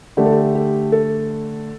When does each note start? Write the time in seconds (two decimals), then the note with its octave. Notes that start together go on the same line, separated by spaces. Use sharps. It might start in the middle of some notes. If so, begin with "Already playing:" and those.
0.17 D3 A3 D4 G4
0.25 A4
0.32 G4
0.55 G4
0.92 A4